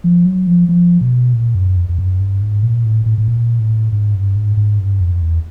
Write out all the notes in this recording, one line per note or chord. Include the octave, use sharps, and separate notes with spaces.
F3
F#3
F3
F3
B2
A#2
F#2
F2
F2
F#2
G2
G#2
A#2
A2
A2
A2
A#2
A2
G#2
G2
G#2
G#2
G2
F2
E2